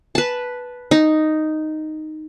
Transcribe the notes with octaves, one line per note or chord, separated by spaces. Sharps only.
B4 A5
D#4